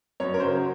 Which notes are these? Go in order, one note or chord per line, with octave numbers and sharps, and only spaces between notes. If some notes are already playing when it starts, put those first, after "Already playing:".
F#2 C#5
A#4
C#3 F#3 C5